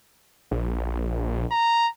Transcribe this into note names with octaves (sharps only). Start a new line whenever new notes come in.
A#1
A#5